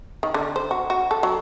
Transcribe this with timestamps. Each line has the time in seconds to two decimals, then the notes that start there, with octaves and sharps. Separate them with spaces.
0.23 D#3
0.34 D3
0.56 C5
0.71 F#4
0.90 F#4
1.11 A4
1.23 F#3